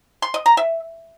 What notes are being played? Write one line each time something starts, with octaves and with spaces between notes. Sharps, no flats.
C6
D#5
A#5
E5